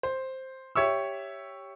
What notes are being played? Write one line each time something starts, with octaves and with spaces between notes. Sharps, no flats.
C5
G4 C#5 E5 C#6 E6